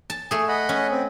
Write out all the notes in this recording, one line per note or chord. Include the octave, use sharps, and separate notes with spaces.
A5
A3 G#4
D#5 F#5 B5
C#4
C4